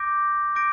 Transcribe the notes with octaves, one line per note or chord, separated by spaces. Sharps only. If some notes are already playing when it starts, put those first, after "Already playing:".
Already playing: D6 G6 A#6 D7
D6 G6 A#6 D7